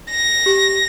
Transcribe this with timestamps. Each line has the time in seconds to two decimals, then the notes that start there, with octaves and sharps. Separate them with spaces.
0.10 A#6
0.46 G4